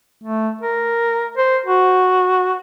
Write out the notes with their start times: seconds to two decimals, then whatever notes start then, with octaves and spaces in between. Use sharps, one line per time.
0.24 A3
0.61 A#4
1.37 C5
1.66 F#4